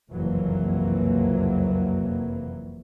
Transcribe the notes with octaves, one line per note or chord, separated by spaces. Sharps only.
F#1 C2 F2 E3 F#3 A#3